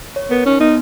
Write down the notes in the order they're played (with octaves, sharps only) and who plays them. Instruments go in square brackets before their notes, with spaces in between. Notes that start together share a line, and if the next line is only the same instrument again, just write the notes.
[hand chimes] C#5
[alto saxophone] B3 [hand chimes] A#4
[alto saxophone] C#4 [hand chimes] D#4
[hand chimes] B3 [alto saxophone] D#4